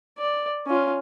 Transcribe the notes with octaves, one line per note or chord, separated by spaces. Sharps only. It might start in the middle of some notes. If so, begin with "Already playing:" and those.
D5
C#4 F4